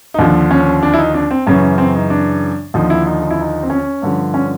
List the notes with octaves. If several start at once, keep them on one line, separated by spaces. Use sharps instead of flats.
D#4
D#2 D3 F3 D4
C#4
D4
E4
D#4
D4
C4
F#2 C#3 E3 C#4
C4
D#4
D4
D#2 D3 F3 D#4
E4
D#4
D#4
E4
D#4
C4
C#4
G2 D3 F3
C#4